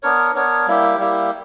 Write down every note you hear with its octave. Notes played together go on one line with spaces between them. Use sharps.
B3 D4 A#4 C#5
B3 D4 A#4 C#5
G3 A#3 E4 G4
G3 A#3 E4 G4